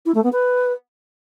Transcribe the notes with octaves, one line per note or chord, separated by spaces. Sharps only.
E4
A3
B3
B4